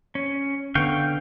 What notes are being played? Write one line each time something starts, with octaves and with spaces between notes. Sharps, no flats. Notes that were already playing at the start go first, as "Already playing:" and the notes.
C#4
D3 B3 F5 G5 C#6